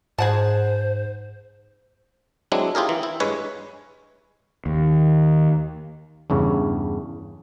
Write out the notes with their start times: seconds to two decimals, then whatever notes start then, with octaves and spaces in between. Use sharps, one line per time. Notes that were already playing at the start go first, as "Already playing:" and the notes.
0.19 G#2 G#4 C5 F#5 A5
2.52 F#3 G#3 C4 D4 E4
2.75 E4 F4 G4 G#4 A#4
2.89 E3
3.03 E4
3.20 G2 G#3 B4 C#5 G#5
4.66 D#2
6.30 E2 G2 C#3